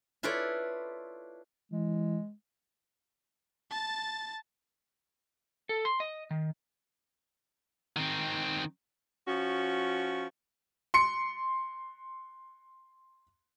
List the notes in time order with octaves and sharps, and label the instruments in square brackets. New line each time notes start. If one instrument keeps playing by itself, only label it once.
[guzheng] E4 F4 A4 B4 C#5 D5
[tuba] E3 [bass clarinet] G#3
[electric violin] A5 A6
[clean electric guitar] A4
C6
D#5
D#3
[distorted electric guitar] D#3 C4
[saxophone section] F3 C#4 F#4
[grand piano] C6 C#7